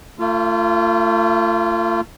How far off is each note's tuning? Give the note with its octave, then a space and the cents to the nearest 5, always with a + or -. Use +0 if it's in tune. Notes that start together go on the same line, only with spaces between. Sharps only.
A3 +35 F4 -20